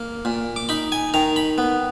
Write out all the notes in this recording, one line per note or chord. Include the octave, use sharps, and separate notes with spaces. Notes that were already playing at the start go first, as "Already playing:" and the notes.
Already playing: A#3
A#2
D6
D#4 B5
G#5
D#3 A#5
B5
B3